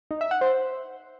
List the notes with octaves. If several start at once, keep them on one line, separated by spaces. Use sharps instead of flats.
D#4
E5
F#5
C5